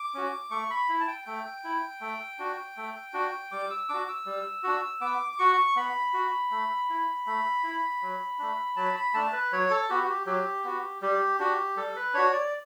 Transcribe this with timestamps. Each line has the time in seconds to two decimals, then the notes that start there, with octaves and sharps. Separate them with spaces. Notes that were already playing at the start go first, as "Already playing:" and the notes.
Already playing: D6
0.14 C#4 F#4
0.51 A3 C#6
0.70 B5
0.89 E4
1.00 A5
1.08 G5
1.26 A3 G5
1.64 E4
2.01 A3
2.39 D4 F#4
2.77 A3
3.14 D4 F#4
3.51 G3 D6
3.70 E6
3.89 D4 F#4 D6
4.08 E6
4.26 G3
4.63 D4 F#4
5.01 B3 D6
5.32 D6
5.39 F#4 C#6
5.76 B3 B5
6.13 F#4
6.51 A3
6.90 E4
7.27 A3
7.64 E4
8.02 F#3
8.39 A3 D4
8.76 F#3 A5
8.96 B5
9.14 A3 D4 A5
9.32 B4
9.52 F#3 C#5
9.71 A4
9.90 B3 F#4 G4
10.03 F#4
10.08 G4
10.26 F#3 G4
10.64 B3 F#4
11.02 G3 G4
11.40 D4 F#4 G4
11.76 G3 A4
11.96 B4
12.14 D4 F#4 C#5
12.33 D5